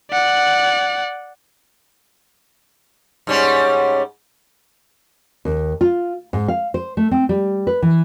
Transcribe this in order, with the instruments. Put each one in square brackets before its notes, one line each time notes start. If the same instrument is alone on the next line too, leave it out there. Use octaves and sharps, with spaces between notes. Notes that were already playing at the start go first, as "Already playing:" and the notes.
[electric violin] D5 F#5
[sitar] G#2 G3 C#4
[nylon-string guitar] D#2
F4
G#2
F5
C5
A3
C4
G3
B4
E3